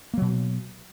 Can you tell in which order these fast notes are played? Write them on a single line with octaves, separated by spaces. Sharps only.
A#3 F#3 B2